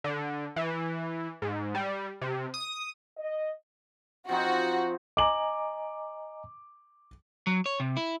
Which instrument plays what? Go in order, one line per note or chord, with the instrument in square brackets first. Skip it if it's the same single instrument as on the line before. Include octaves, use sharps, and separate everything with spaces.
[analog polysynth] D3
E3
G#2
G3
C3
D#6
[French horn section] D#5
[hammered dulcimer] F3 C4 D#4 [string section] F#4
[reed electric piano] D#5 G#5 A#5 [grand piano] D6 F#7
[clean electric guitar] F#3
C#5
C3
E4